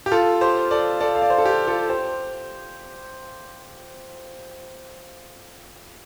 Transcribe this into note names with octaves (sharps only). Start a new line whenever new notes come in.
G4
F4 A4
G4 C5
A4 D5
A4 D5
F5
D5
C5
A4
G4
F4 A4
G4 C5